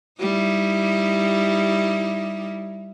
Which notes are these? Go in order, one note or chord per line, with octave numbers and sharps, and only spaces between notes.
G3 D#4 E4